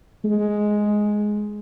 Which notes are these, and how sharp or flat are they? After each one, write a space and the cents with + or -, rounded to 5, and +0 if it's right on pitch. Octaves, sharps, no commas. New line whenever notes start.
G#3 +5